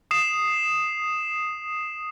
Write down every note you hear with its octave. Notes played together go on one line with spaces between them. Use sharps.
D#6 C7 E7